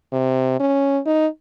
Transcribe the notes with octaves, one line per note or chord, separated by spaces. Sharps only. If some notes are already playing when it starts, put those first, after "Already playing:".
C3
C#4
D#4